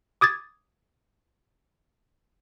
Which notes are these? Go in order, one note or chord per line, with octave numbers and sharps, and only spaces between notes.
D6 D#6 G#6 A6